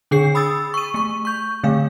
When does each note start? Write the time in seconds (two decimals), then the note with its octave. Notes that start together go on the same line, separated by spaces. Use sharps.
0.11 D3 D4 G#4 C7
0.35 B5 D#6 E6 A6
0.74 C#6 D#7
0.94 A3 C#6
1.25 C#6 G6
1.64 D3 A3 F5